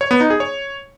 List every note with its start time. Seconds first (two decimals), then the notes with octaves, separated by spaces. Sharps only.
0.01 C#5
0.11 B3
0.20 D#4
0.30 G#4
0.40 C#5